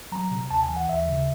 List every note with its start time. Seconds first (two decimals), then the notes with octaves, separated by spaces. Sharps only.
0.12 F#3 A#5
0.31 C3
0.51 D#2 A5
0.63 G#5
0.69 E3
0.76 F#5
0.88 D#2 E5
1.08 C#3